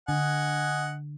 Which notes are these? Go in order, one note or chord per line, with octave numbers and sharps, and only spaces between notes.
D3 D#5 F#5 G#5